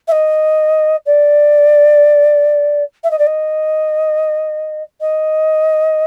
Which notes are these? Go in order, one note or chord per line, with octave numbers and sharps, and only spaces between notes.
E5
D#5
D5
E5
D#5
D5
D#5
D#5